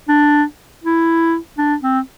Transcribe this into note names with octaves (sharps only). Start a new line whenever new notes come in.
D4
E4
D4
C4